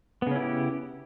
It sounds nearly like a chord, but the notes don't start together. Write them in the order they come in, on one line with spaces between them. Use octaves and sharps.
B3 C#3 C#4 E4 G4